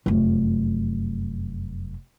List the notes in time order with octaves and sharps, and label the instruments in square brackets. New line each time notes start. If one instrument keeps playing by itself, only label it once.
[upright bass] F1 F#2